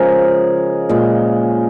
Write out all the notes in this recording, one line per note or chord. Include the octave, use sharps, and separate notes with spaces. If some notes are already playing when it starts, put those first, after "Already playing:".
Already playing: C#3 F3 G#3 G#4 A#4
A#2 G#3